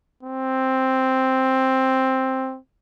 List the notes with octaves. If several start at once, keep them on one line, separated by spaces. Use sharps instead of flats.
C4